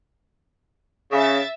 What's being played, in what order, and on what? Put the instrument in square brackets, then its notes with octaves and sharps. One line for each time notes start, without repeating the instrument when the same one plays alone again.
[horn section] C#3 [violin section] E5 A6